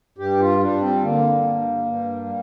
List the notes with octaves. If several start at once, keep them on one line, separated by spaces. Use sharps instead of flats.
G2 G4
F4
G3 D4
C4
D3 A#3
G2
G2
G3